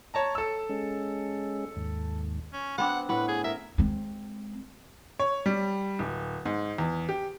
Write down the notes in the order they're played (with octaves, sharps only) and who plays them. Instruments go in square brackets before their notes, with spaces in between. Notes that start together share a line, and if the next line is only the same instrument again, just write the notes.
[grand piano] C#5 A5 A#5
A4 E6
[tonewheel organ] G#3 C#4
D#2 G#2
[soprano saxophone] C#4
[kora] B3 C4 D4 [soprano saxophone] F#5
[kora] A2 F#5 [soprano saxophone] B4
[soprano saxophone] G#4
[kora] A#4 [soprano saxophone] E5
[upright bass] G#3 C4
[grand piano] C#5
G3
D1
G#2
E2
G4